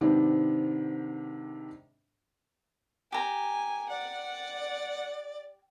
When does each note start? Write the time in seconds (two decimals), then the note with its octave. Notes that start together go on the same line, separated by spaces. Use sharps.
0.01 G#2 C3 D#3 B3 D4
3.12 G4 G#5 A#5
3.89 D5 F#5